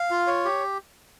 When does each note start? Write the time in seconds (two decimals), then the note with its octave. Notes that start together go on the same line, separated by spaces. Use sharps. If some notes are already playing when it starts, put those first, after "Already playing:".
Already playing: F5
0.11 F4
0.27 C#5
0.45 G4